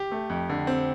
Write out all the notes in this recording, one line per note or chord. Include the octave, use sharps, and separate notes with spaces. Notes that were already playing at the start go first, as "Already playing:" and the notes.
Already playing: G4
A3
F2
D3
C4